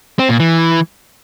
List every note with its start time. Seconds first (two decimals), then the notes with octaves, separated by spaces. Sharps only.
0.19 C4
0.29 A#2
0.40 E3